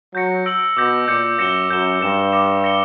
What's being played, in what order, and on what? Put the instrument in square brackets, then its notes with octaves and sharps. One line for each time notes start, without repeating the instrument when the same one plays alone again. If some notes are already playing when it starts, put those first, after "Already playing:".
[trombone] F#3 [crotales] G6 A#6 C#7
[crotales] E6 A#6 D7 F#7
[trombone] B2 [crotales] D6 G6 A#6
[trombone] A#2 [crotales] D6 G6 C#7
[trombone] F#2 [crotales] A#6 C#7 E7 G7
[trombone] F#2 [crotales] G6 A#6 E7 G7
[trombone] G2 [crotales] G6 A#6 E7
[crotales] D6 A#6 C#7 E7
A#6 C#7 G7